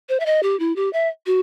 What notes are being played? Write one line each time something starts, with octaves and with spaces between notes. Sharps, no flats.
C5
E5
D#5
G4
E4
G4
E5
F#4